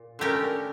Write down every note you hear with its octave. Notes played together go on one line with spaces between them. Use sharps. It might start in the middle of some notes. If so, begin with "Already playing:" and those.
Already playing: A#2
D3 A3 C#4 G4 A#4